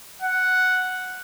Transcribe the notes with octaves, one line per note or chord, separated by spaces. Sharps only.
F#5